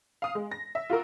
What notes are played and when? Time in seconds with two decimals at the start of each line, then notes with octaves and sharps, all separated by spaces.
0.22 F5 D#6
0.35 G#3
0.51 A#6
0.75 E5
0.90 F4 F#4 A#4 E6